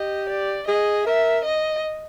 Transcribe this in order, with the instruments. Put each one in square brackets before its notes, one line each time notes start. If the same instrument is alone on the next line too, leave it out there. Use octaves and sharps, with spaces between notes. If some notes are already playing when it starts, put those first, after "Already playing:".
Already playing: [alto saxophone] G4 [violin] D#5
[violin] D5
[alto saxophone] G#4 [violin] D#5
[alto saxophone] A#4 [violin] E5
[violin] D#5